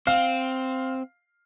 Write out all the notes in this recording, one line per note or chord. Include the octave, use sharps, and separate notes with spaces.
C4 F5